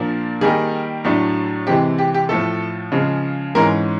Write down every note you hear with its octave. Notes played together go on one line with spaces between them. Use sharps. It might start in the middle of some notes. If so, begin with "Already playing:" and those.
Already playing: A#2 F3 A#3 D4
D#3 G3 A#3 D#4 G#4
A2 F#3 A3 D4
C3 E3 G#3 C4 G4
G4
G4
A2 F3 A3 A4
C#3 F3 G#3
G#2 E3 G#3 C#4 A#4